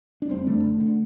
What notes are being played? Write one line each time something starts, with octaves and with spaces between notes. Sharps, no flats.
D4
F1 G3 C4
F2 D3 A3 D4
F1
D3